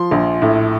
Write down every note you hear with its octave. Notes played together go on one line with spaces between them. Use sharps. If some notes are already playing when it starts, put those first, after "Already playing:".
Already playing: F3 C6
A#1
A2